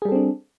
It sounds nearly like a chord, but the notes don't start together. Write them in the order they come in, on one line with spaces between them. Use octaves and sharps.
G#4 G3 A4 C4 D4